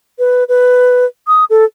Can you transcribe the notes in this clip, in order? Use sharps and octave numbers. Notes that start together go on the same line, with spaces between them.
B4
B4
D#6
A4